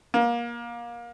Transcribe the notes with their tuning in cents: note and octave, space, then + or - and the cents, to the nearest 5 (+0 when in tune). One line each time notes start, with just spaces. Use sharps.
A#3 +25